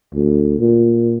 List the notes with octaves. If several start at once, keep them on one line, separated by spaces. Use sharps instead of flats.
D2
A#2